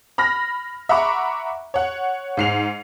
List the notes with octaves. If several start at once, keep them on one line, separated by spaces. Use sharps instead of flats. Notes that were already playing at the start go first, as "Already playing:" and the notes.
B5 F6 A#6
E5 F#5 A#5 B5 C#6 D6
C#5 F#5
G#2 C7 F7